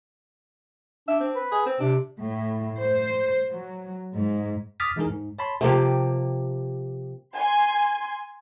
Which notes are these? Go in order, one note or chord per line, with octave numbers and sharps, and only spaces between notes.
D4 E5
C4
B4
G#4
C4
C3 D4
A2
C5
F#3
G#2
D6 D#6 F6 A6 B6
E3 G#3 D4 D#4 G#4 A#4
G#2
C#5 A5 B5 C6
C3 F3 A#3 G4
G#5 C6